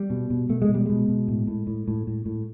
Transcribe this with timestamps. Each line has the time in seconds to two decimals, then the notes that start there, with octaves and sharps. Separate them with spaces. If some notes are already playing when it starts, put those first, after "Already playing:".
Already playing: G3
0.10 B2
0.30 B2
0.49 B2 A3
0.62 G#3
0.69 B2
0.74 G3
0.86 B2 G#3
1.08 B2
1.28 A2
1.47 A2
1.67 A2
1.88 A2
2.07 A2
2.26 A2